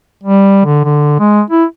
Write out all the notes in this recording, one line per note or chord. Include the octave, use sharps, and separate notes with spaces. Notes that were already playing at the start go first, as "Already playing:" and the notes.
G3
D3
D3
G#3
E4